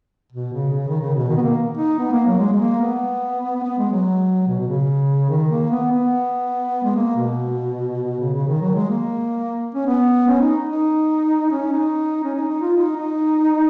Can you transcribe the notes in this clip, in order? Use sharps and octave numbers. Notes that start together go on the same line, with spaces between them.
B2
C#3
C#3
D#3
C#3
B2
D#3
B3
A#3
D#4
B3
A#3
F#3
G#3
G#3
A#3
B3
B3
G#3
F#3
B2
B2
C#3
D#3
A#3
B3
B3
G#3
A#3
B2
C#3
C#3
D#3
F#3
G#3
A#3
C#4
B3
C#4
D#4
D#4
C#4
D#4
C#4
D#4
D#4
F4
D#4
D#4